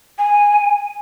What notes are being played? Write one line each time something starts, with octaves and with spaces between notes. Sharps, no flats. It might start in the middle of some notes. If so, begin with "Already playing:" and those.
G#5